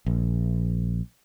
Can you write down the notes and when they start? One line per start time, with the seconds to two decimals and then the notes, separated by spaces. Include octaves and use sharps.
0.06 A#1